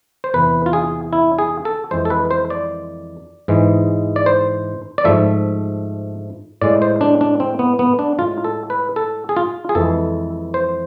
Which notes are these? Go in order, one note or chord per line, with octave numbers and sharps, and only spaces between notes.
C5
E2 C3 E3 B4
F4
G#4
E4
G#4
A4
F2 E3 G#3 C5
A4
B4
C5
D5
G#2 E3 G#3
D5
C5
D5
G#2 F3 A3 E5
A2 G#3 D5
C5
D4
D4
C4
B3
B3
D4
A2 G#3 F4
A4
B4
A4
G#4
F4
G#4
F2 E3 G#3 A4
C5